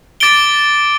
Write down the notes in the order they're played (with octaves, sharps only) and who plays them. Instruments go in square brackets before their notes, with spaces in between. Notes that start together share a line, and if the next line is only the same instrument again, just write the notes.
[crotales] D6 A6 D7 G7